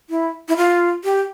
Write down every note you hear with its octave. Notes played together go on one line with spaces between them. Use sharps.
E4
E4
F4
G4